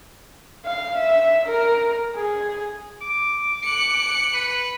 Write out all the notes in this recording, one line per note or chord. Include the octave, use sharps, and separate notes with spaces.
F5
E5
A#4
G#4
D6
F#6 C#7
B4